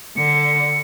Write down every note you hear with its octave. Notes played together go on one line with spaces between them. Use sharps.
D3 C#7